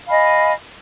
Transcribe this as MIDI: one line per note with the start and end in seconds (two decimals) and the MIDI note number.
0.08 0.52 75
0.08 0.52 77
0.08 0.52 80
0.08 0.52 83